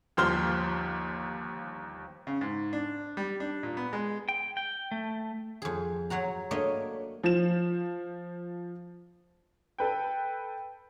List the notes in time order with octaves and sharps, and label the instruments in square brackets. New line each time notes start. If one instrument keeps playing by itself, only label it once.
[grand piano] G1 D#2 F3 C5 F6 G7
[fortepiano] C#3
G#2
D4
G3
D4
A#2
B3
G#3
[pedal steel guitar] G5
G5
A3
[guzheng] F2 G#4
F#3 C#5 F#5 A#5
A3 A#3 D4 C#5 D#5
[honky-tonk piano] F3 E7
A4 B4 G5